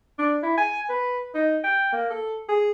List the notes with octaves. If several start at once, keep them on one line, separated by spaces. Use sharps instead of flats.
D4
E4
G#5
B4
D#4
G5
A#3
A4
G#4